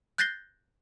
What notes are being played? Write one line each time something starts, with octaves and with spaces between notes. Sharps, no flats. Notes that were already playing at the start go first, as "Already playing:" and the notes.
F#6 G6 A6 A#6 C7 G7